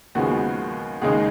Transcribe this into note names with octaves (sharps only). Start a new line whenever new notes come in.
D#2 C#3 F3 G#3 B3 F#4
D#2 C#3 G#3 D#4 G#4